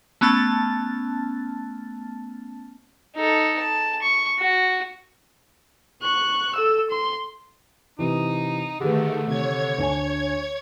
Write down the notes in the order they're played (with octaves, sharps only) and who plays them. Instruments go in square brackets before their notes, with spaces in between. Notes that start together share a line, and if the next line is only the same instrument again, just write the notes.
[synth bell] A3 B3 C#4 A5 F6 A6
[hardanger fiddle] D#4 A4
A5
C#6
F#4
[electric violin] C#6 F#6
A4 E6
C6
[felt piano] C3 E3 [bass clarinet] D#4
[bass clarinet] D3 [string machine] D#3 A3 [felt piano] G4 G#4 B4
[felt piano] C3 [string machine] C#5 G#6
[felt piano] D2 D4 G#5